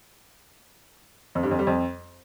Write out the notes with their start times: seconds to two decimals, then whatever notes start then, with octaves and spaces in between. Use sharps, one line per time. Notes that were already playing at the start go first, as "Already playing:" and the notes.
1.35 F2
1.43 G2
1.51 F2
1.59 G3
1.67 F2